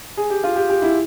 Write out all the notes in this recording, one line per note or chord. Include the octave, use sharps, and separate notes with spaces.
G#4
G4
F4
G4
G4
E4